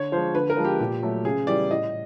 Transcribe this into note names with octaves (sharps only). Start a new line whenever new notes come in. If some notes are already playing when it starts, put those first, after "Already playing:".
Already playing: D3 C#5
F3 G#3 C5
D3 B4
A#4
F3 G#3
G4
A#2
F#3 A3
C#3 G#4
E3 G3 D5
A2 D#5